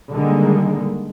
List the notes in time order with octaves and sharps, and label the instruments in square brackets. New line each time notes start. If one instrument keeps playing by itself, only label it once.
[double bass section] D3 D#3 G3 G#3 A#3